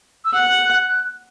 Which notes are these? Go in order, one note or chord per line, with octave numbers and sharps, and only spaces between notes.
E6
F#5 F#6